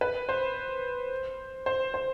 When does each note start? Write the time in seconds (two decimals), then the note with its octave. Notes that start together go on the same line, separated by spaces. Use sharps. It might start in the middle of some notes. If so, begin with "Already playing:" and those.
0.01 B4
0.29 C5
1.66 C5
1.94 C5